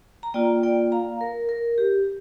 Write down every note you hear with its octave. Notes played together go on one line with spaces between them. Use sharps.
A#5
A#3 F4 D5 G5
D5 G5
F5 A#5
A#4
A#4
G4